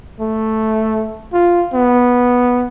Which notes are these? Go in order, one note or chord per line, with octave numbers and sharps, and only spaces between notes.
A3
F4
B3